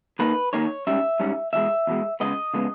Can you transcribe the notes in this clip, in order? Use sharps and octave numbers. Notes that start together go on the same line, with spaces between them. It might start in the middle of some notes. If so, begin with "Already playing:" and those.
D#3 A#3 D#4 B4
D#3 A#3 D#4 C#5
G#2 G3 C#4 E5
G#2 G3 C#4
E2 B2 G#3 E5
E2 B2 G#3
C#3 G#3 B3 D#5
C#3 G#3 B3